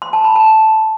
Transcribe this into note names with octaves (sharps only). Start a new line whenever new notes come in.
C6
A5
B5
A5